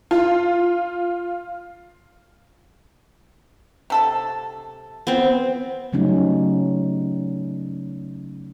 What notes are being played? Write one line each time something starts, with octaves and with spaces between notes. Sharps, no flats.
F4
C3 A4 A5
B3 C4
C#3 F#3 G3 A3 C#4 D#4